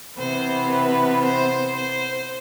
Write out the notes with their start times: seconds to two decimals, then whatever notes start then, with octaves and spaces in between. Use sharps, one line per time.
0.18 C3 E3 B3 C5
0.71 B4
1.23 C5
1.75 C5